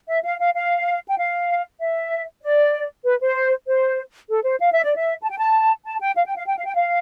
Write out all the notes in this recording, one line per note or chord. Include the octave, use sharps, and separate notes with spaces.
E5
F5
F5
F5
G5
F5
E5
D5
B4
C5
C5
A4
C5
F5
E5
D5
E5
A5
G5
A5
A5
G5
F5
G5
F5
G5
F5
G5
F5